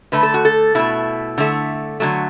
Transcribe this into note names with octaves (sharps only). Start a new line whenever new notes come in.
D3 A3 B4
A4
F#4
A4
B2 A3 E4
D3 A3
D3 F#3 A3